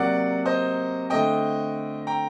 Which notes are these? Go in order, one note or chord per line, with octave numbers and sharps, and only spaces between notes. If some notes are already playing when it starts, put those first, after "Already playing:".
Already playing: C3 F#3 A#3 D5 F#5
C5 D#5
D3 A3 C4 D#5 G5
G5 A#5